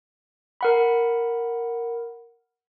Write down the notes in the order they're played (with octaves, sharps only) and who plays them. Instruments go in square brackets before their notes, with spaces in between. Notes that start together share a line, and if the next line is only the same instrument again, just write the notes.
[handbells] A#4 F#5 B5